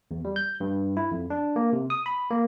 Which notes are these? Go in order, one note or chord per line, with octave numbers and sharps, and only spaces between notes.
E2
G3
G6
G2
E4
F2
D4
A#3
C3
D#6
B5
A#3